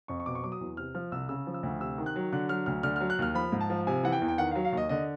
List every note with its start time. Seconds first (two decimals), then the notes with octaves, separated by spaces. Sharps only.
0.08 F2 C#6
0.20 C#6
0.26 B2 D6
0.35 C#6
0.43 F#3 D6
0.52 D#6
0.61 E2
0.77 C3 F6
0.95 F3 F6
1.12 C2 E6
1.29 C#3 E6
1.47 F3
1.54 E6
1.63 D2
1.80 C3 E6
1.98 D#3
2.06 F#6
2.16 F#3
2.33 D3 F#6
2.49 F#3 F6
2.66 D2 F6
2.83 D3 F6
2.96 F6
3.00 F#3
3.10 F#6
3.19 D#2 F6
3.35 F3 B5
3.52 G#2
3.61 A5
3.70 F3
3.87 C3 G#5
4.03 E3 F#5
4.12 G5
4.22 E2
4.28 G5
4.38 D#3 F#5
4.51 F#3 F5
4.65 F5
4.72 D#2
4.77 D#5
4.89 D3 D#5